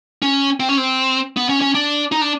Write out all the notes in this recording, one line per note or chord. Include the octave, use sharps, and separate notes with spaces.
C#4
C4
C#4
C4
B3
C#4
C#4
D4
D#4
D4